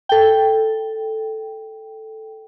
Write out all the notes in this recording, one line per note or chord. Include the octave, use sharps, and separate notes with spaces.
A4 G5